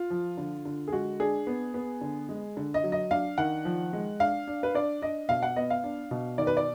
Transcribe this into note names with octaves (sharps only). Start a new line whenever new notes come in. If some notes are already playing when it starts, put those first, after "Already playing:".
Already playing: F4
F3
D3
D3
G#4
G#3 F#4
D4 G#4
B3
B3
D3
G#3
D3
D#5
F#3
D#5
D4 F5
D#3 F#5
F3
G#3
D4 F5
D4
B4
D4 D5
D4 D#5
B2 F5
F#5
B3 D#5
F5
D4
B2
D#3 D5
B4
D5